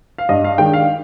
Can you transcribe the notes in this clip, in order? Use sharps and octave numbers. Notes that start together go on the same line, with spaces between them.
F5
G2 D#5
F5
D#3 G#3 D4 G5
F5